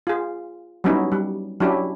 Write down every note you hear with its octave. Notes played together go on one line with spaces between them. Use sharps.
F4 G#4
F#3 G3 B3 C#4 D#4 E4
G3
F#3 C#4 D4 E4 G4